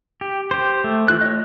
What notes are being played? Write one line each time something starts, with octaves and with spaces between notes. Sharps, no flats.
G4
G4 C5
A3
E3 F4 F#6
C#5 D#5